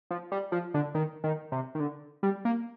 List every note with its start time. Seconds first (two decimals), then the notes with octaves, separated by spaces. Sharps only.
0.11 F3
0.32 G3
0.52 F3
0.74 D3
0.95 D#3
1.24 D#3
1.52 C3
1.75 D#3
1.80 D3
2.23 G3
2.45 A#3